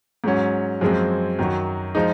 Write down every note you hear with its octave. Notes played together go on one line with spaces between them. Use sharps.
G#2 F#3 C#4
F#2 F3 G#3 C4
F#2 D#3 F#3
F3 G#3 D#4